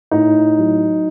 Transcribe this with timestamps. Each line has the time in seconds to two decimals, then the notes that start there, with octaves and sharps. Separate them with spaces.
0.11 A2 D#4
0.58 F#3